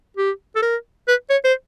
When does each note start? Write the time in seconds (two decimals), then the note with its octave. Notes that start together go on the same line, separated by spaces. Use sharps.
0.17 G4
0.56 A4
0.62 A#4
1.08 B4
1.30 C#5
1.45 C5